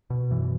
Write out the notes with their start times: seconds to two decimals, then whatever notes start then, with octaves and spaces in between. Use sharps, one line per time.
0.10 B2
0.31 F#2 E3